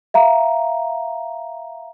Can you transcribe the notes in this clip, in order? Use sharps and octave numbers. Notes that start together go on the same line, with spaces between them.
E5 F5 A#5